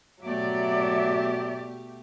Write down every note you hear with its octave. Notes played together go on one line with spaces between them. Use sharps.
B2 F#3 A3 G4 D5 E5